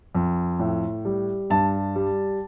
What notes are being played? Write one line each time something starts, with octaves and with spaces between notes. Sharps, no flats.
F2
A2
G3
G2 A5
G3